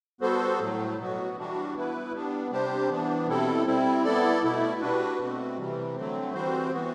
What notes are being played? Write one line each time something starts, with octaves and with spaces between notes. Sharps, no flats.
G3 B3 F#4 A4 C5
A2 F#3 A3
B2 F#3 B3 F#4
E3 G3 D4 F#4
B3 E4 B4
G3 B3 D4
C3 G3 D4 G4 C5
E3 B3 D4
B2 G3 C4 E4 A4
G3 C4 E4
B3 E4 A4 D5
B2 A3 E4
G3 D4 F#4 B4
B2 A3 C4 F#4
C3 E3 G3
D3 F#3 A3 C4
E3 G3 C4 F#4 C5
E3 B3 F#4